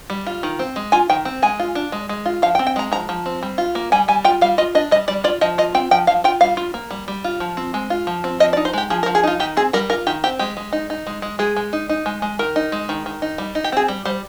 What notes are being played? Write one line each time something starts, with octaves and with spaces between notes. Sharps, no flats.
G3
F4
D#3
C4
G#3
F4 G#5
D#3 G5
C4
G#3 G#5
F4
D4
G#3
G#3
F4
F3 F5
G5
C4
G5
G#3 A#5
F3 A#5
F3
C4
G3
F4
A#3
G3 G#5
G3 G#5
F4 G5
G3 F5
F4 D#5
D4 D#5
G3 D#5
G3 D5
F4 D5
F3 D#5
F4 D#5
C4 G5
F3 G5
F3 F5
F4 G5
G3 F5
F4
A#3
G3
G3
F4
F3
C4
G#3
F4
F3
C4
F3 D#5
D5
D#4
C5
G#3 G4
F3 G#4
A#4
F3
G#4
D#4 F4
D#3 G4
C4 G#4
G3 A#4
F4 A#4
D#3 G4
C4 G4
G#3 G4
G#3
D#4
D#4
G#3
G#3
G#3 G#4
G#3
D#4
D#4
G#3
G#3
D#3 A#4
D#4
G#3
D#3
D#3
D#4
G3
D#4
G4
C4 G#4
G3
G3 C5